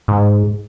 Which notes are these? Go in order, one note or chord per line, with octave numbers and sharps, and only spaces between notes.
G#2